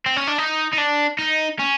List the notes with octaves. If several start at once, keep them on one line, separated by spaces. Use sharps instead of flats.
C4
C#4
D4
D#4
D#4
D4
D#4
C#4